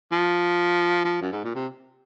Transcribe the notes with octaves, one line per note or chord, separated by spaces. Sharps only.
F3
F3
F#2
G#2
A#2
C3